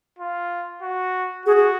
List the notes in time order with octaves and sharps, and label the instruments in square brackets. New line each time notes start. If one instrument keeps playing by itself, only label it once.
[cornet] F4
F#4
[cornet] F#4 [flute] G#4
[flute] G#4